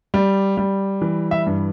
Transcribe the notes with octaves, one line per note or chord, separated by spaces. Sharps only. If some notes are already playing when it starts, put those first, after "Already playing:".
G3
G3
E3
E5
G2